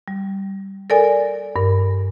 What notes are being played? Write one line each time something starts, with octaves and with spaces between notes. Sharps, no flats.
G3
A4 A#4 D5 G#5
G2 A#4